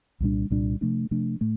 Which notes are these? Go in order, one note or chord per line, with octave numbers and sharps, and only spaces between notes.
C2 A#2 G3 D4
C2 A#2 G3 D4
C3 F3 A3 D4
C3 F3 A3 D4
A2 A3